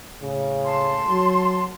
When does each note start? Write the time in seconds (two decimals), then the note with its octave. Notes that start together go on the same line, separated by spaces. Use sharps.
0.21 A2 C#3
0.65 A5 C6
1.08 F#3